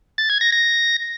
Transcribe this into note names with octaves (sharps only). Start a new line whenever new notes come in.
A6
G#6
A#6
A#6